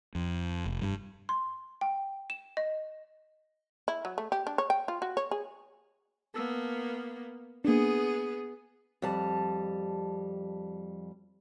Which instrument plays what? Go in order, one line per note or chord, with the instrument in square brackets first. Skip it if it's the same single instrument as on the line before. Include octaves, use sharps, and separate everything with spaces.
[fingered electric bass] F2
F1
G2
[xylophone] C6
G5
E7
D#5
[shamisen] E4
F#3
A3
G4
D4
C#5
G5
F4
F#4
C#5
G#4
[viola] A#3 B3 [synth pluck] A5 E6
[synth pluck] A#3 D4 [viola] B3 G#4
[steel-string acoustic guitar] F2 G3 A5